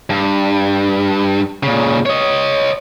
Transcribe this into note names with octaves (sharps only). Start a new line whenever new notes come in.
G2
A#2 C#3
C#5 D#5